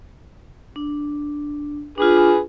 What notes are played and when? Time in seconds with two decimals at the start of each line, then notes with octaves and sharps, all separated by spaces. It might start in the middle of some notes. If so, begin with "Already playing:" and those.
0.76 D4
1.98 D4 F4 G#4 B4